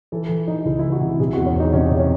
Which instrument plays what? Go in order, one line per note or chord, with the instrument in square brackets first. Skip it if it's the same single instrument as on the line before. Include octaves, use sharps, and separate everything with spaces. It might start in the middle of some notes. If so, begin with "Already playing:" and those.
[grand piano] E3 [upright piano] A4
[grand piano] E3
[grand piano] E3 [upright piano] D#4
[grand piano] C#2 [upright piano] E4
[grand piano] E3 [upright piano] E4
[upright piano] F#4
[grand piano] C3
[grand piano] C3 [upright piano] G#4
[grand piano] E2 [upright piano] F#4
[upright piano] C#4
[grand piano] E2 [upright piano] D#4
[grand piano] C3 [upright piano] C#4
[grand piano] C3
[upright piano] C#4